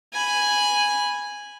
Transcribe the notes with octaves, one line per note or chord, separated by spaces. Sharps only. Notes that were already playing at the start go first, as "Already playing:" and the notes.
G#5 B5